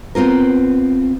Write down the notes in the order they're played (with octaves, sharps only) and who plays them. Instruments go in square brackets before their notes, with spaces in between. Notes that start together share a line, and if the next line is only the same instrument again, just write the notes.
[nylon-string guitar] B3 C4 F4 A#4